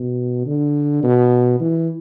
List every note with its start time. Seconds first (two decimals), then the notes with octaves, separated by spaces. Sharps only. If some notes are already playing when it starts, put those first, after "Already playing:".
Already playing: B2
0.46 D3
1.03 B2
1.60 E3